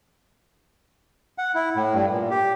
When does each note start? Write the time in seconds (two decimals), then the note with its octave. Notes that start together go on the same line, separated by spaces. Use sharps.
1.38 F#5
1.55 E4
1.76 A2
1.94 G2
2.11 A#2
2.30 G4